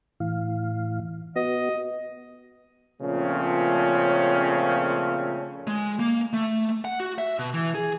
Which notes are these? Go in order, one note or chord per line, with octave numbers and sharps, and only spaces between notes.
A2 E3 F5
B3 F#4 D#5
A#2 C#3 F3 A3 C4 C#4
G#3
A#3
A3
F#5
F#4
E5
B2
E3
G#4